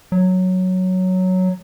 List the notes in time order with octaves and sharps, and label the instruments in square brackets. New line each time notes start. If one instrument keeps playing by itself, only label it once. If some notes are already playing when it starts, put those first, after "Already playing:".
[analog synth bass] F#3